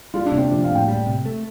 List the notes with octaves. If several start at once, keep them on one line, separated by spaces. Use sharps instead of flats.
G3 F4
D4
C3
C4
F3 D4
F5
A2
G5
G3
C3
A3